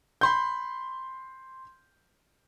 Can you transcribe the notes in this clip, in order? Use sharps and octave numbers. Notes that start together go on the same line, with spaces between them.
B5 C6 G6